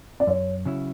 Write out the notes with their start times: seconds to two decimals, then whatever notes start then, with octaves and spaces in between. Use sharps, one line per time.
0.20 D5
0.27 F#2 C#5
0.65 C#3 F#3 C#4 E4